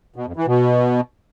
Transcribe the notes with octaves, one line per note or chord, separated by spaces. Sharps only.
B2
F2
E3
B2